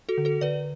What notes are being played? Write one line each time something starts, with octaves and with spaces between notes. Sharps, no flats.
F#4 A4
D3
F#4 A4
D3 B4 D5